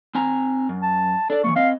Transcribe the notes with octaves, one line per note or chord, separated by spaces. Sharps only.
C4 G#5 A#5
F#2
A5
D4 A4 D5
E3 F3 A#3 C#6
C4 D#5 F5